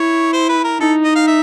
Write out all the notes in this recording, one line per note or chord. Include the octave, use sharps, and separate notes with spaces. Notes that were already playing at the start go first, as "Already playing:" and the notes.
Already playing: E4 C#5
C5
B4
A#4
D#4 A4
D#5
F5
E5